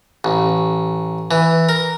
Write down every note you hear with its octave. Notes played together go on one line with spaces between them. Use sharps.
A1
E3
A#4